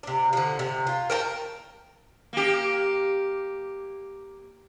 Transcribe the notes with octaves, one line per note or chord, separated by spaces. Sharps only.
C3 D4
D3 F3
C3
F4
A#4 G5 A5
A#3 G4